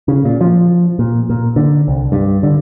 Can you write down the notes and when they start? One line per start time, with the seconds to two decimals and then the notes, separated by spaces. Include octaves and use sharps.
0.08 C#3
0.25 A#2
0.41 F3
0.99 A#2
1.29 A#2
1.56 D3
1.88 C2
2.12 G2
2.43 D3